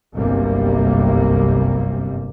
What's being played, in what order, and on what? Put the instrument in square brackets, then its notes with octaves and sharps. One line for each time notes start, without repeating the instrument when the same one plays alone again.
[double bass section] G1 C2 F#2 C3 G3 A#3